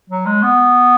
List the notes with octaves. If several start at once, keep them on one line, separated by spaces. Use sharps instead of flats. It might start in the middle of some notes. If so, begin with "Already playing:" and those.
F#3
G#3
B3